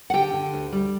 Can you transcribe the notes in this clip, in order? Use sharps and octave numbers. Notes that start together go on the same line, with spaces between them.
F#5
D3 G4 G5
D3
D2
G3